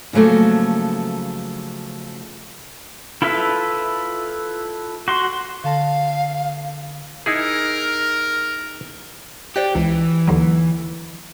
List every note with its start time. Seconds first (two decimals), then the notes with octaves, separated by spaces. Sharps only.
0.13 C#3 F3 F#3 A3 A#3
3.22 E4 F4 A4 B4 E5
5.08 F#4 C6
5.63 D3 F5 A5 A#6
7.26 D#4 E4 G#4 A#4
9.56 G4 C5 D5 F#6
9.75 C#2 E3
10.27 D#2 D3 F#3